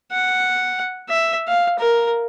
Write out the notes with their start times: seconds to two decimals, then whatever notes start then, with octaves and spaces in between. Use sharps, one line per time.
0.12 F#5
1.09 E5
1.47 F5
1.79 A#4